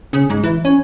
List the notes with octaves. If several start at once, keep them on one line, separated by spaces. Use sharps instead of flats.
C#3
G#2
E3
C#4